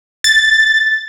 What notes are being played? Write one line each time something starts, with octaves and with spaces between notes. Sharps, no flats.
A6